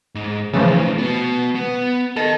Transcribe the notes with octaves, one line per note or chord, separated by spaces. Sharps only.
G#2
B1 C#3 E3 F3 A3
B3 F#4
B3
A4 A#4 D#5